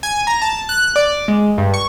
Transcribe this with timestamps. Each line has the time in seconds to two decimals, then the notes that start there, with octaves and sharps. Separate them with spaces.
0.03 G#5
0.27 A#5
0.42 A5
0.69 F#6
0.96 D5
1.28 G#3
1.58 G2
1.74 C#6